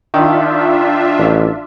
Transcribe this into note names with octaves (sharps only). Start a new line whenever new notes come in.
D#3 D4 F4 E5
A1